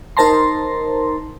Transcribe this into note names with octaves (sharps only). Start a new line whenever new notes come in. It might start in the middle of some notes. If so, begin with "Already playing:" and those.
D#4 A#4 C5 A5 A#5 C6